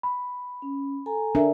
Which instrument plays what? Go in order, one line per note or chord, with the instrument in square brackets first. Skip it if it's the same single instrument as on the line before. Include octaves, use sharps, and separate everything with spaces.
[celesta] B5
[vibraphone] C#4
A4 G#5 A#5
[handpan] D4 [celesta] A#4 E5